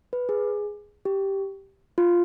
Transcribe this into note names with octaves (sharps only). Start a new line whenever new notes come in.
B4
G#4
G4
F4